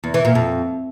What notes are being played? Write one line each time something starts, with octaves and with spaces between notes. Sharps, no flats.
E2
E3
A#2
F2